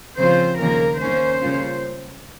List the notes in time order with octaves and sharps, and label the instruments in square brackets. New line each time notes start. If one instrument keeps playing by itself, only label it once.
[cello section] C#3 F3 C4 F4 C5
D#2 C#3 F3 A#3 A#4
D#3 A#3 C#4 C5
C#3 G3 A#3 C#4 F4